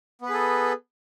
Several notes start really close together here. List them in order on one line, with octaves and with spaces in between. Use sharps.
B3 B4 G#4 A4